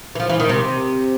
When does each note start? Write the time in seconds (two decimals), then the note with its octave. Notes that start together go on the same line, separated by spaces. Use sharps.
0.15 E3
0.20 F3
0.29 E3
0.40 D#3
0.49 C3